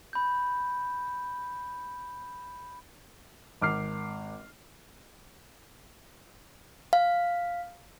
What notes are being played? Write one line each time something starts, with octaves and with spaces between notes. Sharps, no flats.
B5 G6
G#1 D6 F6 C7
F5